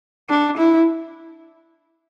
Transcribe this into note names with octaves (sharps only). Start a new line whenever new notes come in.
D4
E4